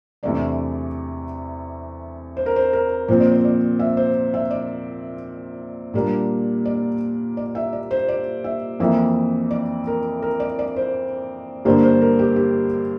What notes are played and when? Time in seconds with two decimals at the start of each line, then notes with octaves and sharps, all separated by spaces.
0.23 E2 C3 E3 A3 D4 D5
2.37 C5
2.46 A#4
2.56 C5
2.73 A#4
3.08 A#2 F3 C4 C5
3.20 D5
3.32 C5
3.45 D5
3.79 E5
3.97 C5
4.34 E5
4.51 D5
5.94 A#2 G3 A#3 D4
6.65 D5
7.37 D5
7.55 E5
7.73 D5
7.91 C5
8.08 D5
8.44 E5
8.80 F2 E3 A#3 E5
9.51 D5
9.87 A#4
10.22 A#4
10.40 D5
10.59 D5
10.76 C5
11.65 G2 D3 G3 A#3 D4 C5
11.83 C5
12.02 A#4
12.19 G4
12.36 G4